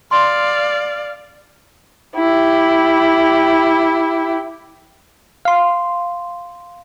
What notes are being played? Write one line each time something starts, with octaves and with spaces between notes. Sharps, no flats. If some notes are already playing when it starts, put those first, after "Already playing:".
D5 F5 C6
E4 G4
F5 C6